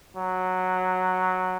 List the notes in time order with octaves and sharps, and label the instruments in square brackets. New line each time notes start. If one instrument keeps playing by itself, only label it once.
[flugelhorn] F#3